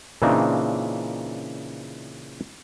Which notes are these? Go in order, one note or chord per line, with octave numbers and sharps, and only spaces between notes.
A#2 C#3 E3 C4 D4 D#4